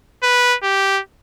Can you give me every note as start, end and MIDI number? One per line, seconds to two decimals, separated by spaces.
0.23 0.56 71
0.63 1.00 67